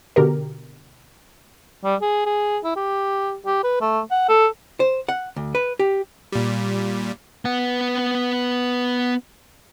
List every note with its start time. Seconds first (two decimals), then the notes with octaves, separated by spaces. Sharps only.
0.16 B2 D3 G4 A#4
1.84 G3
2.01 G#4
2.26 G#4
2.64 E4
2.76 G4
3.46 G4
3.64 B4
3.81 A3
4.11 F#5
4.29 A4
4.80 C5
5.09 F#5
5.36 D2
5.55 B4
5.79 G4
6.32 A#2 G3
7.45 B3 F#5